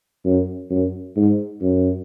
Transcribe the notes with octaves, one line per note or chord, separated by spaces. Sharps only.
F#2
F#2
G#2
F#2